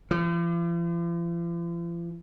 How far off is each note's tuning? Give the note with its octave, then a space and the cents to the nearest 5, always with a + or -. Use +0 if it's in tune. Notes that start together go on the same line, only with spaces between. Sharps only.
F3 -45